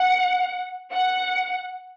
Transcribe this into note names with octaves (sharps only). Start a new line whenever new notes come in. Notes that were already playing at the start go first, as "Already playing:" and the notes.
Already playing: F#5
F#5